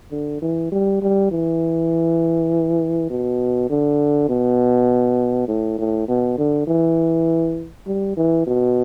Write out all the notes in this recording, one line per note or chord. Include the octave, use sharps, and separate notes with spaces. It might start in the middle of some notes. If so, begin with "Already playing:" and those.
D3
E3
G3
G3
E3
B2
D3
B2
A2
A2
B2
D3
E3
G3
E3
B2